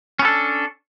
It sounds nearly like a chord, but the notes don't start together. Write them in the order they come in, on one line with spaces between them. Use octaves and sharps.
C#4 B3 A4 D4